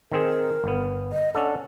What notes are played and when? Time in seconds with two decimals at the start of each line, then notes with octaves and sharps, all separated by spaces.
0.12 D#3 C4 G#4 A#4
0.64 G1 B3
1.12 D#5
1.35 C#4 D4 A4 F#5